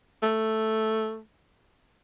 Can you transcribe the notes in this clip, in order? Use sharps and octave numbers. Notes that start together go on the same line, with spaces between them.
A3